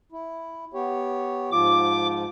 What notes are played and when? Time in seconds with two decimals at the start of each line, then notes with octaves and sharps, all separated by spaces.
0.12 E4
0.74 B3 G4 C#5
1.52 G#2 F3 F4 D6